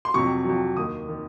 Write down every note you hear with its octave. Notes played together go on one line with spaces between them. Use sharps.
C6
F2 C3 F#3 C#6
F2 C3 F#3
D#2 D#3 A#3 D#6
D#3 A#3